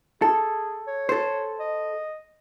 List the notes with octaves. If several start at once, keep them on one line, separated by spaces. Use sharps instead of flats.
G#4 A4
C#5
A4 C5
D#5